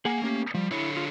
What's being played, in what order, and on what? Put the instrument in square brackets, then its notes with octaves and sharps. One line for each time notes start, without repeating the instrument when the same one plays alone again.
[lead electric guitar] A#3 [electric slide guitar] G#4 F#5 G#5
[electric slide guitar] A3 C#4 G4
[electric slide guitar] F3 [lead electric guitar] G3
[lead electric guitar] D3 C#5 [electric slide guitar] E4
[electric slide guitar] F4